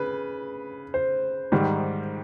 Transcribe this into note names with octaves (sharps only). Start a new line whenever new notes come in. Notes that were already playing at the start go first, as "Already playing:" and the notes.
Already playing: C#3 B4
C5
G#2 D#3 G3